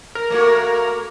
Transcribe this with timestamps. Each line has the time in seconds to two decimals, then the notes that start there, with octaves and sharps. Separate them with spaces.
0.15 A#4
0.30 A3 A#3 F#4